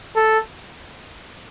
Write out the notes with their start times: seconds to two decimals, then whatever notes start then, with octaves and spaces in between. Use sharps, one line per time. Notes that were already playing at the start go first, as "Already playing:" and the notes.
0.16 A4